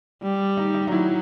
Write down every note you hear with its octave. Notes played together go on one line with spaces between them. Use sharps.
G3
D#4
D#4
D#4
F#3 E4